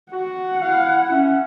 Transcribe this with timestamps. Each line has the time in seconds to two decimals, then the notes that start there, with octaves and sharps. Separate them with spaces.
0.12 F#4 F#5
0.62 E4 F5
1.11 C#4 E5